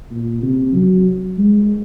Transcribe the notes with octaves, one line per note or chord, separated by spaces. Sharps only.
A#2
C3
F#3
G#3